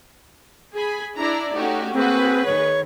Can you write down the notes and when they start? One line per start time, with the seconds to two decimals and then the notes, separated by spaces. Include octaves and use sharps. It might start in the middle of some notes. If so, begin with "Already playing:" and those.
0.73 G#4 G#5 B5
1.17 D4 E4 D5 A#5
1.56 A3 C#4 D#4 F#4 G4
1.94 A#3 C4 F#4 G#4 B4
2.46 D#3 C#5